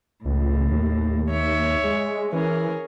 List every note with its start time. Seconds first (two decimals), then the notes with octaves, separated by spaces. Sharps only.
0.25 C#2 A2
0.71 D#2
1.30 C#5 E5
1.84 G#3
2.33 E3 C#4 G#4 A#4